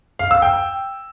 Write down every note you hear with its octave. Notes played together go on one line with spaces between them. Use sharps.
F5
E6
G5